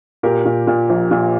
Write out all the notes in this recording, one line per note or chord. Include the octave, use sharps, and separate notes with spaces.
A#2 G4 A#4
A#2
A#2
A#1
A#2